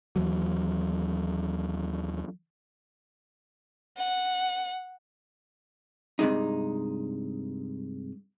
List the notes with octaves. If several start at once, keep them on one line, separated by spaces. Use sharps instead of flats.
D#2 E3 F#3
F#5
G2 C3 G#3 D#4